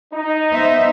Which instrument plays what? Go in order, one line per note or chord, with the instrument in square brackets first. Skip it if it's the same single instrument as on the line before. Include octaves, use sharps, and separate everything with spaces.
[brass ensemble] D#4
[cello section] B3 C5 E5